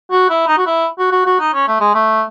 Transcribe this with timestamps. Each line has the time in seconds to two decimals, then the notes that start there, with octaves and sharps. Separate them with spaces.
0.11 F#4
0.30 E4
0.48 D#4
0.58 F#4
0.66 E4
0.99 F#4
1.11 F#4
1.26 F#4
1.40 D#4
1.53 C#4
1.67 A3
1.80 G#3
1.94 A3